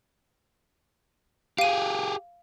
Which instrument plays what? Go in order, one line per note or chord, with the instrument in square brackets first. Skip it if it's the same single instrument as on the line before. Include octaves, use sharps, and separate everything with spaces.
[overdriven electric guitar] G4 G#4 [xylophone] F5 D#7